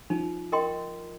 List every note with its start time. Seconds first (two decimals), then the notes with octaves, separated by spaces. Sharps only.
0.10 F3 D#4
0.52 A#4 D#5 G5 C6